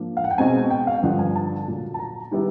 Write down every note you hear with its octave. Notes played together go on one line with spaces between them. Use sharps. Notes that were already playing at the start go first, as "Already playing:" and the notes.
Already playing: G#2 F3 A#3 D4
F5
F#5
G5
B2 G#3 C4 D#4 G#5
G5
F5
G2 D3 F3 F#5
G#5
A5
A#2 F#3 A#3
A5
A#5
D#3 G3 B3 E4